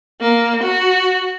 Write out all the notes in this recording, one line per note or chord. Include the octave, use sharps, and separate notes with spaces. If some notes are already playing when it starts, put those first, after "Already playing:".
A#3
F#4